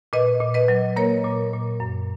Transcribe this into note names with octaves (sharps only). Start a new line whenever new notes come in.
A#2 B4 D#5
A#2
B4 D#5
F#3
A#3 A#4 C#5
A#2
A#2
F#2